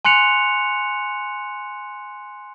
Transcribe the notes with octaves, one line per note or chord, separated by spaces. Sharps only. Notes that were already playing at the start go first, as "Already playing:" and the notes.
G#5 C6 F#6 C#7 F7